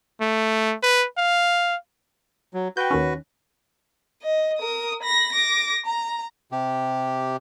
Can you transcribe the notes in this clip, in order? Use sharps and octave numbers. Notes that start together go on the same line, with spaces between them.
A3
B4
F5
F#3
F#4 B4 G5 G6
D#2 D#3 C#4
D#5
A#4 D#6
B5 A#6
D6 A#6
A#5
C3 G4